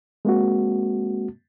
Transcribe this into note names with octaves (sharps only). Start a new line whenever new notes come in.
G#3 A#3 C4 F#4